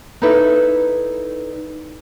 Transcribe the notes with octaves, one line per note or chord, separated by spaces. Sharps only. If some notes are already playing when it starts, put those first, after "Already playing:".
D#4 E4 A4 B4 D5 E5